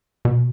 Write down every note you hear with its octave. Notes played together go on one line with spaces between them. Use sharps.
B2